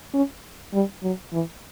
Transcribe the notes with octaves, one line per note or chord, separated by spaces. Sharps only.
C#4
G3
F#3
E3